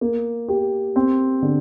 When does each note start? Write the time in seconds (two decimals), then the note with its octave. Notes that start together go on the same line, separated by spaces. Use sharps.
0.01 A#3
0.48 G4
0.96 C4
1.42 D3